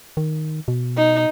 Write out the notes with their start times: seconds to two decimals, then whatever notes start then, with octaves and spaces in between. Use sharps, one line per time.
0.17 D#3
0.68 B2
0.97 D#4